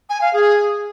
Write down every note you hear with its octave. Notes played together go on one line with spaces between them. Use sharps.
G#5
F5
G#4